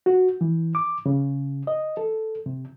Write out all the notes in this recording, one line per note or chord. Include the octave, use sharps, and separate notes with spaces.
F#4
E3
D6
C#3
D#5
A4
C3